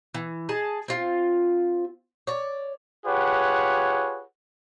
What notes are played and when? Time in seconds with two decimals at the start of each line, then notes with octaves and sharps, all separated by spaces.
0.14 E3
0.49 G#4 D#5 A5
0.88 C4 F4
2.27 C#5 D5
3.05 F4 G4 G#4 B4 C#5 F#5